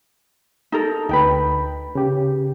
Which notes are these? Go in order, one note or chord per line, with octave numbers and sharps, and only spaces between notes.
D#4 A4 A#4
D2 D#4 B4 G5 B5
C#3 G4